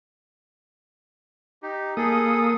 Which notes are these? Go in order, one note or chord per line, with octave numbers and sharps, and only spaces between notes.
D#4 G4
A#3 G#4 A4 D#6